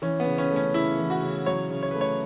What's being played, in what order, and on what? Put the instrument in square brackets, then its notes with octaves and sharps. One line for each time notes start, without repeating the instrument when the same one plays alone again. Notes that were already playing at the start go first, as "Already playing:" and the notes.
[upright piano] E3 [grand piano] C#4
[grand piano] B3
[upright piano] C#3
[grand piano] C#4
[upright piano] A3
[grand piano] C#4
[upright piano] C#3 [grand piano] E4
[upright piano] E3
[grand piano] F#4
[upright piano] C#3
[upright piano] F#3 [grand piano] C#5
[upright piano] C#3
[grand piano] C#5
[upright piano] A3 [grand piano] B4
[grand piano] C#5